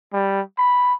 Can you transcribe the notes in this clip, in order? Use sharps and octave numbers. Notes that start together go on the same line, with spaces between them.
G3
B5